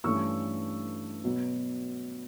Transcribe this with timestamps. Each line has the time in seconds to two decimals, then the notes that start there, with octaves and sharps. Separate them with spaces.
0.04 G2 E3 A3 C#4 C#6 E6
1.24 B2 F#3 B3